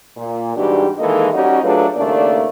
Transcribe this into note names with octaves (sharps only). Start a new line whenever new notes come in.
A#2
G#2 E3 G3 D4 F#4 G4
D#3 E3 G#3 A#3 A4 D#5
G3 C#4 D#4 F#4
F#3 A3 D4 F4 G#4 B4
D#2 C#3 A3 A#3 D4 D5